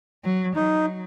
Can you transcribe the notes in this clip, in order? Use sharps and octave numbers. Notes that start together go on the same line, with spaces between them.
F#3
F#3 D#4